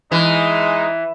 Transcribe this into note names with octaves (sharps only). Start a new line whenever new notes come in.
E3 G#3 D#4